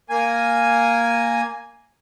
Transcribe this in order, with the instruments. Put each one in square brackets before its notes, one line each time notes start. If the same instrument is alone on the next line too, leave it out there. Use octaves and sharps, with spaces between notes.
[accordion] A#3 G#5